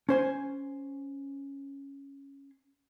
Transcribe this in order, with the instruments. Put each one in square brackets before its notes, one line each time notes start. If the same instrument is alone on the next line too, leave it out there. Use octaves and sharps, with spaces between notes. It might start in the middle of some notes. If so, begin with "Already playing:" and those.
[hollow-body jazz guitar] C#4 C5 G#5